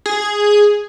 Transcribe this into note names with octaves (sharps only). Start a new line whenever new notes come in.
G#4